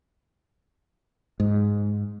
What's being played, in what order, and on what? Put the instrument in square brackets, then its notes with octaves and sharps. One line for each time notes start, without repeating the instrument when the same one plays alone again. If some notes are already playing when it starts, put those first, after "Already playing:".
[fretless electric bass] G#2